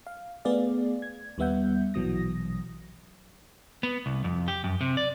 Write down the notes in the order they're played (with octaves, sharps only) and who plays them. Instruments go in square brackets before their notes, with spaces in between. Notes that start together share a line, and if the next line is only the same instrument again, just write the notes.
[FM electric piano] F5
A3 B3 G#4 D5 F5
G#6
D#2 G3 B3 E5 F#5 G6
A#1 B2 E3 F#3 D#6 A#6
[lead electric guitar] B3
C2
F2
G4
F#2
C3
D5